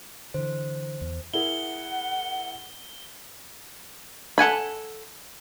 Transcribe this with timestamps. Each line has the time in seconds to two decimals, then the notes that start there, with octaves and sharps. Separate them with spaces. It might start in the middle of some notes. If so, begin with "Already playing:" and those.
0.34 D3 E3 C5
1.01 E2
1.34 E4 G#4 A#4 F#5 G7
4.38 A4 F#5 G#5 B5